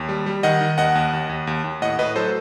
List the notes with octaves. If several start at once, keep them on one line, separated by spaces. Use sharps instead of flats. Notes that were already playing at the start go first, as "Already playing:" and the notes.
Already playing: D#2
G3
G3
D#3 D#5 F#5
D#3
D#2 D#5 F#5
D#2
D#2
D#2
D#2
D#2
A2 D#5 F#5
A2 B4 D#5
F#3 A4 C5